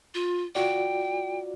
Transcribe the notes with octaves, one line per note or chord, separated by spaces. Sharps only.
F4
F4 F#4 D5 G5